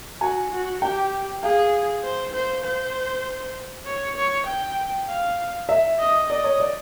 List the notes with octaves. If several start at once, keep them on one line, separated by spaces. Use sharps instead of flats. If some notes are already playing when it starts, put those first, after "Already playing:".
F#4 G#5
F#4
G4 G5
G#4 F5
C5
C5
C5
C#5
C#5
G5
F5
E5
D#5
D5 D#5
C#5
D5